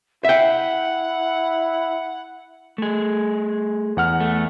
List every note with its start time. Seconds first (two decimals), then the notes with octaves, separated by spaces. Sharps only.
0.25 E4 E5 F#5 G5
2.78 A3 G#4
3.97 E2 F#5 F6
4.20 A3